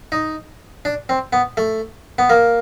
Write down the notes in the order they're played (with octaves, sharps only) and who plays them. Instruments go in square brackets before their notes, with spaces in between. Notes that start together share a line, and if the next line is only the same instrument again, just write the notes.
[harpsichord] D#4
D4
C4
B3
A3
B3
A#3